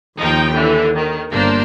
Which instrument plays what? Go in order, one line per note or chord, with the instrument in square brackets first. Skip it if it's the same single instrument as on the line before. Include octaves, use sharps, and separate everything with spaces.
[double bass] D#2 [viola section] F3 D#4 G5
[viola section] D3 E3
D#3
[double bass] G1 [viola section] A#3 D4 C5